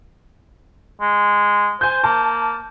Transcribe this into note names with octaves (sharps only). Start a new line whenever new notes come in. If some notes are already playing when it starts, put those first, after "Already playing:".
G#3
C5 G#5 G6
A#3 A5